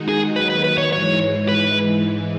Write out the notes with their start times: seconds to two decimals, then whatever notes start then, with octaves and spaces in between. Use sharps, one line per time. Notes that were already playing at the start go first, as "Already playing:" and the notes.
Already playing: D#3 G#3 D#4 F#4
0.09 G#4
0.35 D#2 D#3 F#3 B4
0.50 B4
0.64 B4
0.78 C#5
0.93 G#2 E3 G#3 C#5
1.48 B4